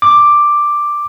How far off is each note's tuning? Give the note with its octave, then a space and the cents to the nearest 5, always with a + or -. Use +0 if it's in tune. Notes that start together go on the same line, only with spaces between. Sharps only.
D6 +5